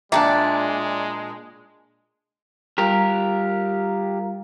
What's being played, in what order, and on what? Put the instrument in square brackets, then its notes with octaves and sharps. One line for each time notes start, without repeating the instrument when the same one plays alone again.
[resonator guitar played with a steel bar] A#2 D4 [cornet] G#3 [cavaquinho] D5 A5 [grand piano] E5 G5 A#5
[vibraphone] G3 F4 F5 [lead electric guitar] G4 A#4